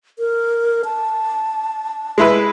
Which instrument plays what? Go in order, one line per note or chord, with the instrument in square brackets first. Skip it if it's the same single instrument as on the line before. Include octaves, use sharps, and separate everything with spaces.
[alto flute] A#4
A5
[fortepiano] G#3 E4 B4